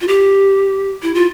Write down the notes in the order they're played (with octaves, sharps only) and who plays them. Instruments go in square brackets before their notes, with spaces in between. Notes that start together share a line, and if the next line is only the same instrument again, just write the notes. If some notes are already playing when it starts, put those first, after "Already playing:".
[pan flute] F4
G4
E4
F4